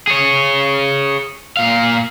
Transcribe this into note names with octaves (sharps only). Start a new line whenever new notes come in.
G#4 C#5
A#2 F5